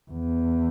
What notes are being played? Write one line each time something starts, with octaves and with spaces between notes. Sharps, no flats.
E2